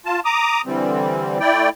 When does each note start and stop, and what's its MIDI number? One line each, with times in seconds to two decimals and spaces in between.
0.06 0.20 65
0.06 0.20 81
0.25 0.61 82
0.25 0.61 86
0.25 0.61 87
0.66 1.39 50
0.66 1.39 52
0.66 1.39 55
0.66 1.39 60
1.40 1.69 57
1.40 1.69 64
1.40 1.69 74
1.40 1.69 79